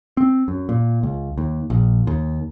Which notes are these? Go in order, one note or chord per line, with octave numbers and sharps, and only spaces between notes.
C4
F#2
A#2
C#2
D#2
A#1
D#2